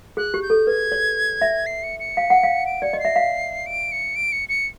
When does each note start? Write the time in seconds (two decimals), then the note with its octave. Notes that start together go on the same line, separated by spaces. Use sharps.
0.17 G#4 F#6
0.34 G4
0.42 G6
0.50 A4
0.67 B4 G#6
0.92 C#5
1.42 E5
1.66 C7
1.83 C#7
2.00 C#7
2.17 F5
2.30 F#5
2.43 F5
2.66 D7
2.82 D5 C#7
2.93 D#5
2.99 C7
3.05 E5
3.16 F5
3.66 D7
3.92 C#7
4.16 D7
4.32 C#7
4.49 C#7